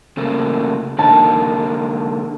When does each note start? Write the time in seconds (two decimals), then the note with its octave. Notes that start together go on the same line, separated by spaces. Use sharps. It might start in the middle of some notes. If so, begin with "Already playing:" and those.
0.17 C#3 A3 A#3
0.99 D3 A#3 D#4 A5